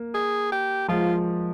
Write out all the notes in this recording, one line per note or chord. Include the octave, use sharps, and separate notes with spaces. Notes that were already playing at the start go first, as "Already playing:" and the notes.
Already playing: A#3
G#4
G4
F3 G#3 F4